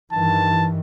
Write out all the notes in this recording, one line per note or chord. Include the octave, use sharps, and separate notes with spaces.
G2 D#3 E3 A5